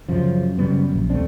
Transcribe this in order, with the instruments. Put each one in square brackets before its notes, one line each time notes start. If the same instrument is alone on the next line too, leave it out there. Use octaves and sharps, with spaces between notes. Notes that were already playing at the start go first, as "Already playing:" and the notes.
[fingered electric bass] F#2 [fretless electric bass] C#3 F3
[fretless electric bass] C#3 G3 B3
A#1
[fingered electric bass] D#2 C4 [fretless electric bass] A3 D4